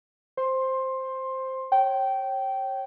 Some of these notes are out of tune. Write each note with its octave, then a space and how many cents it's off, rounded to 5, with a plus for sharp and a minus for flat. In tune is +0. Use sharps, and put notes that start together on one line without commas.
C5 +0 C6 +15
C#5 -30 G5 -20